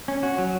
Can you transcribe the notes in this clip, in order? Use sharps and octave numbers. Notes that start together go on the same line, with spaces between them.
C#4
F#4
F#3